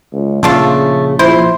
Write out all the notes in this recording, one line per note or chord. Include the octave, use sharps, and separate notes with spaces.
C#2
A#1 C#3 A3 D4 F4
F3 E4 C5